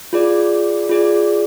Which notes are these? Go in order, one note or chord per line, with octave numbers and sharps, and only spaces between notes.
F4 G#4 D5
F4 G#4 D5